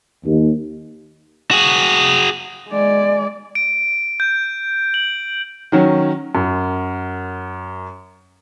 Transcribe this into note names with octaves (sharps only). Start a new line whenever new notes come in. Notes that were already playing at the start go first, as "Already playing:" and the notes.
D#2
F#4 G#4
G#3 D5
D7
G6
F#7
D#3 F#3 C#4
F#2